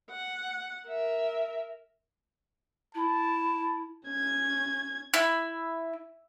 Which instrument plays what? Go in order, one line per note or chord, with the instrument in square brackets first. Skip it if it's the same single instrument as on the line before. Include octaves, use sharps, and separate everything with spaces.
[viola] F#5
A#4 E5
[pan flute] E4 [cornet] A5
[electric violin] C#4 G#6
[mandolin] E4